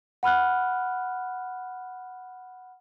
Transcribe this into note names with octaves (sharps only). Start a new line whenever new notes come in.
F#5 B5 F6 F#6